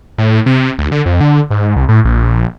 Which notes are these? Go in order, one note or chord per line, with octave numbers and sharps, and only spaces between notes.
A2
C3
D2
D3
F2
D3
G#2
C2
A2
A#1